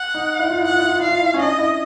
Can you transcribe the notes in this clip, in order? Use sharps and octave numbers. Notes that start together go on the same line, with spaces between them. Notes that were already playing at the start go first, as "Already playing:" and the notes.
Already playing: F#5
D#4
E4
F4
E4
F4 F#5
E4
F4
E4 F5
F4
E4
C#4
D4 D#5
E4